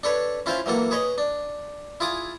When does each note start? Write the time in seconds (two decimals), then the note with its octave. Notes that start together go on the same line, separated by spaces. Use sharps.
0.03 D4 A4 B4 C#5
0.46 C#4 E4 F4 C5 E5 F5
0.66 E3 F#3 A#3 A4
0.91 G#4 B4 C#5 D#5
1.18 D4
2.00 E4 F4 G#4 D6 D#6